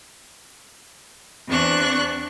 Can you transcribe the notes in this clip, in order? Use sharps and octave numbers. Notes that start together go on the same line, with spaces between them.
E2 C4 D4 C#6 F#6